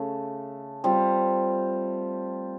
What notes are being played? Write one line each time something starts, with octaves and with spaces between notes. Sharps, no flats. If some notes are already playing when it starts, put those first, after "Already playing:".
Already playing: C#3 A3
G3 C4 F4